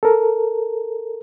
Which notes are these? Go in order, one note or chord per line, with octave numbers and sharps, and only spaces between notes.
A4 A#4